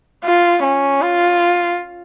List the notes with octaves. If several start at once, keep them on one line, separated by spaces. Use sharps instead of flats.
F4
C#4
F4